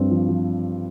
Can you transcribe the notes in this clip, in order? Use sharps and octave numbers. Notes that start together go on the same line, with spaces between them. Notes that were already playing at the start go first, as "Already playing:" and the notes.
Already playing: G2 F3 C4
F3
F3